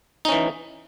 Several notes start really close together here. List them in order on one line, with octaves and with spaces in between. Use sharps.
D#4 C#4 E3